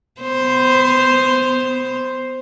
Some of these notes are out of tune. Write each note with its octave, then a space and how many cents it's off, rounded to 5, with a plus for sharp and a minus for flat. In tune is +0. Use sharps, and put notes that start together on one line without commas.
B3 +30 C5 +0